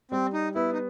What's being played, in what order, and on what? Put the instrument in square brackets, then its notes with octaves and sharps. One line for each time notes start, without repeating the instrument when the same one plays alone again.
[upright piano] G3 [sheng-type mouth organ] C4
[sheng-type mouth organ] D#4
[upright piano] B3 [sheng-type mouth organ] E4
[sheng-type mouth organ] D#4